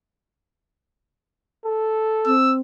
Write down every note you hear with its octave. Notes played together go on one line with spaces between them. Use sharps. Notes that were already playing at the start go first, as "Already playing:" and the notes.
A4
C4 E6